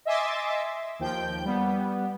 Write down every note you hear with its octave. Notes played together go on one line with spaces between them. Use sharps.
D#5 E5 G#5 C6 D6 A6
D#2 F3 G5 G6
G3 B3